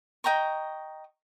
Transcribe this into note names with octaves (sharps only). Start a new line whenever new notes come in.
D#5 G5 A#5 C#6